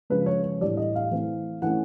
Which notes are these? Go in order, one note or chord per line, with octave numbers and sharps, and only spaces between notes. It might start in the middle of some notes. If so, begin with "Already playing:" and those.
C#3 F3 G#3 B4
C#5
C#5
A2 E3 G3 D5
D#5
F5
E3 A3 C4
E3 A3 C#4 F#5